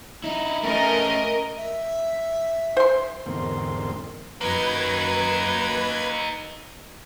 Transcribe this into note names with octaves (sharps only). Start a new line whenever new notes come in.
D#4 E4
A3 C#4 A#4 D#5
E5
C5 C6
E2 G#2 D3 C4 A#4 C6
F#2 A#3 D#4 B4 G#6